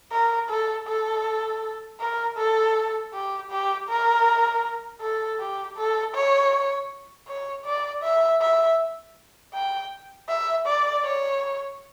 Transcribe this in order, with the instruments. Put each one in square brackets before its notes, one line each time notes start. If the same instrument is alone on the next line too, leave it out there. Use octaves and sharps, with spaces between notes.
[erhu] A#4
A4
A4
A#4
A4
G4
G4
A#4
A4
G4
A4
C#5
C#5
D5
E5
E5
G5
E5
D5
C#5